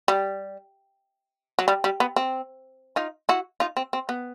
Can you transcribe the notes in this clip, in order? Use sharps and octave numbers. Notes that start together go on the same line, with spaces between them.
G3
F#3
G3
G3
B3
C4
D#4 F4
E4 F#4
D#4 F4
C4
C4
B3